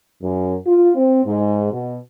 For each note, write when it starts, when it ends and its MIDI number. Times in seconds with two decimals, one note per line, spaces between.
0.22 0.55 42
0.65 0.90 65
0.95 1.21 60
1.25 1.70 44
1.72 1.97 47